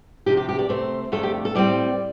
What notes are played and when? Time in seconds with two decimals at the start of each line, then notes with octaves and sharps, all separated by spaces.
0.26 C3 F3 D4 G4
0.37 G4
0.49 G4
0.59 D5
0.69 C3 A3 C4 C5
1.12 F2 C3 A3 D4 A4
1.23 G4
1.45 A4
1.55 A2 G3 C4 D5